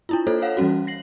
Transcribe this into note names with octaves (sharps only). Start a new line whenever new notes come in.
D4 E4 F4
A#3 F4 A4 C5 C#5
A4 C#5 F5 F#5
E3 G3 C#4 F#4
A#6 C7 F#7